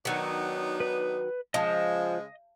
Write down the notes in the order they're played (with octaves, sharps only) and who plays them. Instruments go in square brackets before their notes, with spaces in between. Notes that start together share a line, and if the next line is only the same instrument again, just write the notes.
[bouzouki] D#3 F#3 [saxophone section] B3 D4 D#4
[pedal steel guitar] B4
[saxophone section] C#3 G#3 [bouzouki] F3 [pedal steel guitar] D#5 D#6